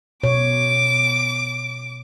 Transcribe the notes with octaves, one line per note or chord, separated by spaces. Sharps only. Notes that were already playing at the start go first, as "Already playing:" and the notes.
B2 C#5 D6